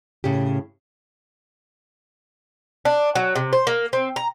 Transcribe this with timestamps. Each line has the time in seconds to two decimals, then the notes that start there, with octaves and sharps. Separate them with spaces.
0.24 A2 C#3 C#4 G4
2.85 D4
3.15 F#3
3.35 C3
3.53 C5
3.67 A#3
3.93 C4
4.16 A#5